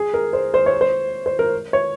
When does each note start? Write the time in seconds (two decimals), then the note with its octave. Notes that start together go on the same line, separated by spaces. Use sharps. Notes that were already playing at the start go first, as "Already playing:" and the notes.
Already playing: G#4
0.14 A#4
0.33 C5
0.54 C5
0.66 C#5
0.81 C5
1.26 C5
1.39 A#4
1.73 C#5